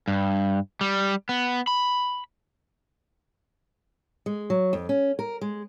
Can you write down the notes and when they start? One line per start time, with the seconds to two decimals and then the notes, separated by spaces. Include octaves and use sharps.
0.08 G2
0.81 G3
1.29 B3
1.68 B5
4.26 G#3
4.50 F#3
4.73 F2
4.89 C#4
5.19 A#4
5.41 G#3